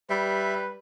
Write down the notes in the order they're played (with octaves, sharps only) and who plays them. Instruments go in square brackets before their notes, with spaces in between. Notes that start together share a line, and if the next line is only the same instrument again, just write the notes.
[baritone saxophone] G3 [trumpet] B4 [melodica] E5